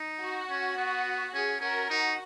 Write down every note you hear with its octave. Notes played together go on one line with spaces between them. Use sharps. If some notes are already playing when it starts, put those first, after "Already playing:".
Already playing: D#4
F#4
C#4
B3
C#4 G#4
C#4 F#4 A#4
D#4 F#4